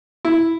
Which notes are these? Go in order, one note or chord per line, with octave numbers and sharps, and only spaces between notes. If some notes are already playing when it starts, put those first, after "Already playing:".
E4